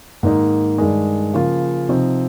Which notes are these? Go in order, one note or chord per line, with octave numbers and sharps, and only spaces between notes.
G#2 D#3 A#3 D#4
G2 D#3 G#3
C#3 F3 A#3 F4
C3 F3 C4 D#4